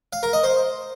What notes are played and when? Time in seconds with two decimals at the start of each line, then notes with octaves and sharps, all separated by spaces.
0.13 F5
0.23 A#4
0.33 D#5
0.43 C5